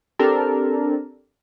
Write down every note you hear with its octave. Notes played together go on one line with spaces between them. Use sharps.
C4 D4 G4 A4 A#4